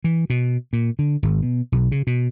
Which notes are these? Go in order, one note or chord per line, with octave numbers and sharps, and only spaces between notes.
E3
B2
A#2
D3
G#1
B2
B1
C#3
B2